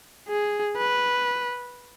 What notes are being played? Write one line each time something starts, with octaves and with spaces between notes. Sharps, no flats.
G#4
B4